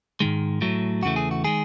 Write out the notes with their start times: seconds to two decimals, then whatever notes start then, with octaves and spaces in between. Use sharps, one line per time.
0.20 G#2 D#3 G#3
0.61 A2 F#3 A3
1.03 E2 C#3 E3 A3 F#4
1.16 G#4
1.31 F#4
1.44 D#3 G#3 G#4